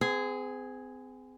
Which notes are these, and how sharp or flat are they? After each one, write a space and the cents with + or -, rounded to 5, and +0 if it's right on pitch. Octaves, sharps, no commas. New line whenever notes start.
C4 -40 G#4 +0